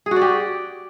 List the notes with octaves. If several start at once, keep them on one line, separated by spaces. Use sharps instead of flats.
G#4
F#4
D5
G4